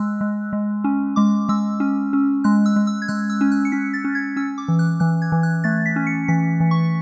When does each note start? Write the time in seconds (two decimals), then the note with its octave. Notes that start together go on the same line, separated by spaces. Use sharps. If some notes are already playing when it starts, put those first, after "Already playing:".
Already playing: G#3 E6 F#6
0.21 G#3
0.53 G#3
0.84 C#4
1.16 G#3 D6
1.49 G#3 E6
1.80 C#4
2.13 C#4
2.44 G#3 F#6
2.66 E6
2.76 G#3
2.87 E6
3.02 G#6
3.08 G#3 F#6
3.30 E6
3.41 C#4
3.52 F#6
3.65 C#7
3.72 C#4 B6
3.93 A6
4.04 C#4
4.15 G#6
4.36 C#4 E6
4.58 D6
4.68 E3
4.79 F#6
5.00 E3 F#6
5.22 G#6
5.32 E3
5.43 F#6
5.64 A3 A6
5.86 B6
5.96 C#4
6.07 C#7
6.28 E3 B6
6.60 E3
6.71 C#6